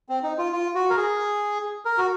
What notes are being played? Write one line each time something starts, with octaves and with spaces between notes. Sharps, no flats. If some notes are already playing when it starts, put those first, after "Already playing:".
C4
D#4
F4
F4
F#4
A#4
G#4
A#4
F#4